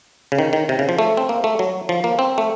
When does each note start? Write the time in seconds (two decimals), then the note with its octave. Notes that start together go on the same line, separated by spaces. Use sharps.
0.32 C#3
0.39 D#3
0.53 D#3
0.69 C3
0.79 C#3
0.89 F3
0.99 A3
1.17 C4
1.29 A#3
1.44 A3
1.59 F#3
1.89 F3
2.04 A#3
2.19 C4
2.38 A3